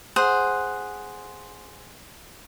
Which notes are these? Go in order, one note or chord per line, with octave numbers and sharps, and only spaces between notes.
G#4 C5 F#5